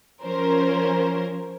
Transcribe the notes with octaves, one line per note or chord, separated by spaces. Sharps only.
F3 C#4 A#4 C5